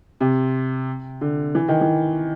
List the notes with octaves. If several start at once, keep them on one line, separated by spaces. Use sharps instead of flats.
C3
D3
E3
D#3
E3